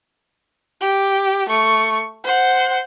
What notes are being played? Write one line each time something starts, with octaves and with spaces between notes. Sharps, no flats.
G4
A3 C#6
C5 F#5